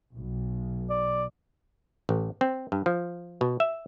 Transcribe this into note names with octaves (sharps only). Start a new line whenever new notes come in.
B1
D5
A1
C4
G2
F3
B2
E5